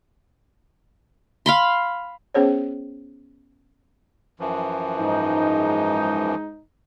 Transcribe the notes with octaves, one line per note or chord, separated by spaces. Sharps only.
F5 B5 C6
B3 C#4 G#4 C5 C#5
F#2 E3 F3
G#2 D#4